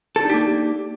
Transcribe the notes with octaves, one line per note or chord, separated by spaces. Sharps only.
A#3 D4 D#4 G4 A4